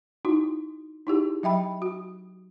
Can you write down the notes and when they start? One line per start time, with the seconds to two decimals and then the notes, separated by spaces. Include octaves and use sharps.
0.25 D#4 E4 F#4
1.07 D#4 E4 G4 G#4
1.43 F#3 E5 G5 B5
1.82 F#4